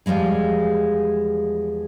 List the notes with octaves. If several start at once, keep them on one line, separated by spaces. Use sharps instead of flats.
E2 F3 G3 G#3 G#4